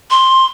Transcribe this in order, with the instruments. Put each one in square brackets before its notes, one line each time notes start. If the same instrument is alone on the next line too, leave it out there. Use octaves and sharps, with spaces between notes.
[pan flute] C6